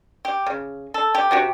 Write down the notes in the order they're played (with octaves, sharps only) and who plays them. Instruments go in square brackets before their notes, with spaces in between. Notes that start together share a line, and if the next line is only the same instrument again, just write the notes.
[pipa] G4
C#3
A4
G4
C3 F#4 G4